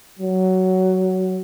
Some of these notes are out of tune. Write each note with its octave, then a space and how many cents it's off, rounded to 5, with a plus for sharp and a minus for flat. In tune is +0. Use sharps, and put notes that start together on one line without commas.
F#3 +10